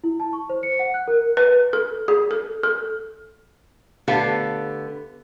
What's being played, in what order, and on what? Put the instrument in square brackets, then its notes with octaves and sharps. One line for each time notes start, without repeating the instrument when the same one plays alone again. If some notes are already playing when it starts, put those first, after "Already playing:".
[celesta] E4
A5
C#6
C5
C#7
F#5
F#6
A#4
[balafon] B4
A4
G#4
A4
A4
[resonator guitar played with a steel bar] D3 A3 B3 G4 A4 F5